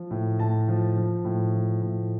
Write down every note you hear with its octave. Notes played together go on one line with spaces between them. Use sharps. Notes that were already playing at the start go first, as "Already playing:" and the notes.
Already playing: F3
A2
A2 A5
F3
F3
A2
F3
A2